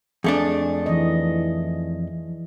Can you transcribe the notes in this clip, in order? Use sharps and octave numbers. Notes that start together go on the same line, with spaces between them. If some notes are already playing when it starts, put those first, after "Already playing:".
F2 A3 D4 G#4
E3 D#5